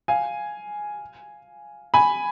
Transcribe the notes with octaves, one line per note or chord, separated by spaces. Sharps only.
F5 G#5
G#5 B5